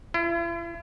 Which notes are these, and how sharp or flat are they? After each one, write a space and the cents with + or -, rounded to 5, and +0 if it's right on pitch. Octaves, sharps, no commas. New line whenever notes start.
E4 +45